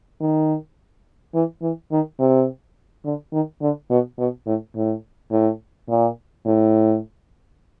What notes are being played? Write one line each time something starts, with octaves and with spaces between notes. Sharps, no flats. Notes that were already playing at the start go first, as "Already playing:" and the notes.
D#3
E3
E3
D#3
C3
D3
D#3
D3
B2
B2
A2
A2
A2
A#2
A2